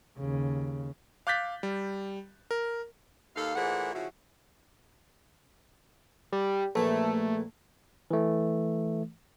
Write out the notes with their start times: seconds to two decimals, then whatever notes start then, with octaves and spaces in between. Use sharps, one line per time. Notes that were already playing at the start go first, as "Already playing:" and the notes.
0.18 D#2 C#3
1.27 F5 D6 F#6 G6 A6 B6
1.63 G3
2.51 A#4
3.36 D#2 D#4 A4 F5
3.55 A#2 E3 A3 G#4 C5 F#5
3.94 C#3 F3 E4 F#4
6.32 G3
6.75 A#1 E3 A3
8.11 E3 A3